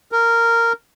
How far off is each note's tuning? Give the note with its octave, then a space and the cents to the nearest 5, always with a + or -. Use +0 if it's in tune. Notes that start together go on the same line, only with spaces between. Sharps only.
A#4 -10